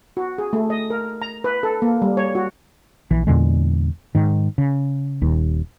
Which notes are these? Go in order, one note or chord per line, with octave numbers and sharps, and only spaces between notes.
F#4
G#4
A3
D#5
A#4
A#5
B4
A4
A#3
G3
C#5
F#4
A#1 E3
E2 A#2 D3 G#3
G#2 D#3
C#3
D#1 D#2